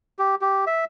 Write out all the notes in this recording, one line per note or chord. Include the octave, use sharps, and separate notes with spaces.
G4
G4
E5